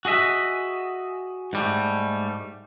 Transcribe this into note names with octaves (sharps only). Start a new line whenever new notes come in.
F#4 G#4 D#5 E5
G#2 G3 A3